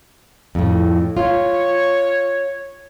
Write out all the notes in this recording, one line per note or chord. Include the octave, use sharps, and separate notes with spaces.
F2 A2
F4 C#5